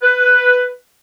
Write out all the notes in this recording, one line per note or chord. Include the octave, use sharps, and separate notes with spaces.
B4